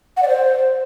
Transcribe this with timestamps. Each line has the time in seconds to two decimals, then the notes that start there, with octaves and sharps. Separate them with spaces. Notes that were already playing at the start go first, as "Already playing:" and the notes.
0.17 F#5
0.22 D5
0.28 C5